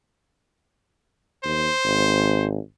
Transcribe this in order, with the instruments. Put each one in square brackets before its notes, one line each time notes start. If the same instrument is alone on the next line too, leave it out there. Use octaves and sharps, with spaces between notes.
[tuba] D#2 [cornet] C5
[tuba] G#1